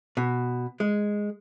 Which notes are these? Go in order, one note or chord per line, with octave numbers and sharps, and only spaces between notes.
B2
G#3